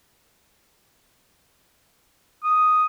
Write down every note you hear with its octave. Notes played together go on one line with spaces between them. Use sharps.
D#6